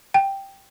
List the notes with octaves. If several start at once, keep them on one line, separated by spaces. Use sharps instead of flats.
G5